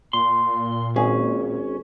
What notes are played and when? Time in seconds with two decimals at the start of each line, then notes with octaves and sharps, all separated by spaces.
0.13 A#2 C6
0.96 G#1 C#4 G#4